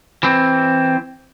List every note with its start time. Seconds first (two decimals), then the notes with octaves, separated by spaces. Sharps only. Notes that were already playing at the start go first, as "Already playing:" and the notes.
0.23 E3 C4